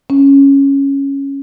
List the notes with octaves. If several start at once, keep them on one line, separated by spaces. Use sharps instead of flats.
C#4